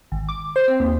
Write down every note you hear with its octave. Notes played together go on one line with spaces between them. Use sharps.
G#1
D6
C5
C4
D#2